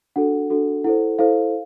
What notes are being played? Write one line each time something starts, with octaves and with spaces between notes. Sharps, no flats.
D4 F#4 A4 F#5
D4 F#4 A4
E4 A4 C5 F#5
E4 A4 C5 F5